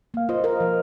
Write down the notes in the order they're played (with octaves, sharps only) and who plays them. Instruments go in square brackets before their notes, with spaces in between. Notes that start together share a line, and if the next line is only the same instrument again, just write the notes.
[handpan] A#3 [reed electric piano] F5
[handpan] F4 [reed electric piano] C5 D#5
[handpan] A#4
F3